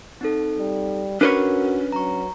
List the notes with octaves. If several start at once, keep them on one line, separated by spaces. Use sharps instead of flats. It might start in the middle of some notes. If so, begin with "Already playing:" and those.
C4 D#4 A4
G3
C#4 D4 F#4 A#4 B4 C#5
F#3 A#5 C#6